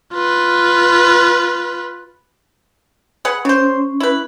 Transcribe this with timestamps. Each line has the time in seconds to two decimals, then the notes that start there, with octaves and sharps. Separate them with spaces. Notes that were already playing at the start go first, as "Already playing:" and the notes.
0.14 F4 B4
3.25 G#4 B4 F#5
3.45 C#3 C#4 C5
4.00 E4 B4